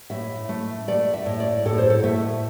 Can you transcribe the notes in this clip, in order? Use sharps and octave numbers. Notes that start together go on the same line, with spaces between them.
A2 E5
A3
A3 D5
E5
A2
D5
A2 A4
C5
A4
A3 E5